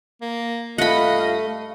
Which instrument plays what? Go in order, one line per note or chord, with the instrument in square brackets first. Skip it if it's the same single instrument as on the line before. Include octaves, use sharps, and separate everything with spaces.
[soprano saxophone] A#3
[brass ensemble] G2 F4 F5 [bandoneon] A3 [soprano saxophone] D#5 [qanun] F#5 B5